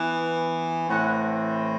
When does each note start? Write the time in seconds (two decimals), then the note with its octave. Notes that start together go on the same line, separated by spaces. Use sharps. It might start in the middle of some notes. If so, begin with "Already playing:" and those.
Already playing: E3 B3
0.88 A2 E3 A3 C4 F#5